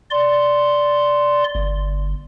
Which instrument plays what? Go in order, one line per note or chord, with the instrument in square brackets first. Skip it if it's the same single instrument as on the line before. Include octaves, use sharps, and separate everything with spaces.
[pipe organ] D5 C6
[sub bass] G1